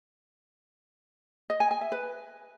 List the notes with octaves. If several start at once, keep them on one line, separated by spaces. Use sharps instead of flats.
D#5
G#5
G#5
E5
B4